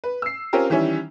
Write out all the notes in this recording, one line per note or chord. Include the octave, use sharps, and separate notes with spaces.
B4
E6 C7
C4 C#4 F4 G4 A#4
D#3 E3 G3 C#4 E4